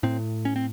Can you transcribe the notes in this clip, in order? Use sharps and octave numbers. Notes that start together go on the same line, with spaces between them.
A2 C4
C#4
C4